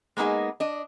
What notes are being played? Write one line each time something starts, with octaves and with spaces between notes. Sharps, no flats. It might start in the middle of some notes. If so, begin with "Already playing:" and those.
G#3 A#3 B3 D#4 G#4
D4 D#5